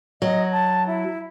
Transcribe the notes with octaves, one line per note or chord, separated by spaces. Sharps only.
F#3 D#5
A5
E4